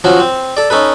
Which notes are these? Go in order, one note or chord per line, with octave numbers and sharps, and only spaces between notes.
F3 F#3 C#4 F#4
C4
A4 D5
C#4 D#4 A4 B4